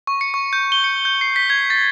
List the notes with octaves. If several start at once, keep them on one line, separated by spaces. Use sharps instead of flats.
C#6
C#7
C#6
G6
G7
C#7
G6
C7
B6
G#6
A6